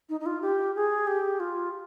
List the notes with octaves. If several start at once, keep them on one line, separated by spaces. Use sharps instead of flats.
D#4
D#4
F4
G4
G#4
G4
F4